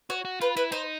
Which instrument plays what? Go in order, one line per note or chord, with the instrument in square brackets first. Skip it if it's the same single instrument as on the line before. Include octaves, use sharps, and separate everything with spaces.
[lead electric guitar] F#4 [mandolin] C#5
[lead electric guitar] F#4
[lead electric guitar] F4 [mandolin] B4
[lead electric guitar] E4 [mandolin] B4
[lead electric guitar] D#4 [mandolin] C5